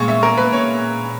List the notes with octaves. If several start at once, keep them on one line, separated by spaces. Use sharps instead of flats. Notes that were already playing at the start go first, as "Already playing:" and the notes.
Already playing: A#2 G#3 C#6
E5
A#4
B4
C#5